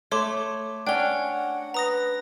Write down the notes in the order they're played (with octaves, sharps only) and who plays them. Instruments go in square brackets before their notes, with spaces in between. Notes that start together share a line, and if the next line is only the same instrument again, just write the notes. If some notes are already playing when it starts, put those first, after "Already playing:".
[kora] A3 [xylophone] C#5 C6 D6
[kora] C#4 D4 [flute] F#5 [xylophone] G5 G7
[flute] B4 [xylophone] A#5 D#6 A#6